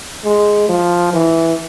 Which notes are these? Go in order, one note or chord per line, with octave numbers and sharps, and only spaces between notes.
G#3
F3
E3